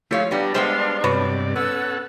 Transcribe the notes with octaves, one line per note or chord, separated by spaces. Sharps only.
F3 A3 E4 G4 C#5 F5
G3 B3 D4 A#5
G3 G#3 B3 G#4 C5 F5 G5 C6
G2 C3 F#4 B4 C#5 D5
B3 C#4 A4 F#5 E6